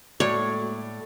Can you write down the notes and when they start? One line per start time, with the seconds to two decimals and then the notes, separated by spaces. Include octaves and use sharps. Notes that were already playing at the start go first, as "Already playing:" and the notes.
0.20 A2 G#3 A#3 F#4 C#5 D5